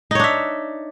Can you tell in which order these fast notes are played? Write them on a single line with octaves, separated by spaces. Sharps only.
D#4 C#5 D4 E5